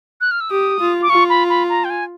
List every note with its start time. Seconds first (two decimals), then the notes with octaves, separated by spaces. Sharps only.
0.21 F#6
0.31 F6
0.41 E6
0.50 G4 D#6
0.80 F4
1.03 D6
1.10 F4 C#6
1.30 B5
1.49 B5
1.69 A#5
1.85 G5
1.90 G#5